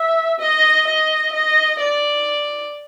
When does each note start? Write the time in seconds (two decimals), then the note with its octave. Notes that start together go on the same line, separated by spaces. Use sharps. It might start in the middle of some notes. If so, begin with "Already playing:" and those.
Already playing: E5
0.40 D#5
0.87 D#5
1.33 D#5
1.79 D5